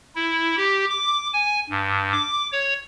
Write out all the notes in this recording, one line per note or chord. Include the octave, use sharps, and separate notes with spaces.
E4
G4
D6
G#5
G2
D6
C#5